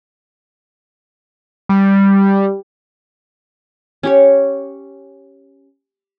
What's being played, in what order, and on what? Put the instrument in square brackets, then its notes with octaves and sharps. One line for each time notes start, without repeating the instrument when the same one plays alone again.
[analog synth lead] G3
[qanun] C#4 G4 C#5